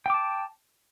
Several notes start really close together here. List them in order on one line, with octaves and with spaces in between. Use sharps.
G5 D6 A5